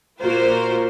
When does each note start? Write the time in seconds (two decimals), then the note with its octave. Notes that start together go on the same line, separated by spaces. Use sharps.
0.22 A#2 A#3 F4 F#4 A#4 C5